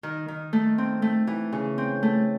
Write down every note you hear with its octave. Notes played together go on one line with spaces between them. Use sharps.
D#3
D#3
A3
C4
A3
E3
C#3
C4
A3